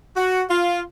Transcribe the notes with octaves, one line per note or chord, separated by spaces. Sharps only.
F#4
F4